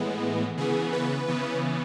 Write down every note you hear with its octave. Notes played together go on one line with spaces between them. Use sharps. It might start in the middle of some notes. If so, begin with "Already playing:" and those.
Already playing: A2 E3 G#3 B3
C#3 E3 B3 G#4
B4
C#3 E3 B3